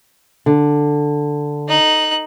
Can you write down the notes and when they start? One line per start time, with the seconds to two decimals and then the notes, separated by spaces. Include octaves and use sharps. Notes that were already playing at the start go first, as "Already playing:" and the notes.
0.46 D3
1.69 D#4 F#6